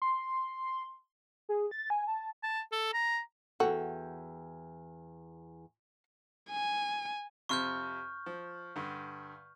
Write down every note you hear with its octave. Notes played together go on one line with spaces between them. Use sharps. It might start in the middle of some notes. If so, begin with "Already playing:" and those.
C6
G#4
A6
G#5
A5
A5
A4
A#5
E2 F#4 A4 G5
G#5
F2 C3 C6 C#6 F6 G6
F3
G2 D3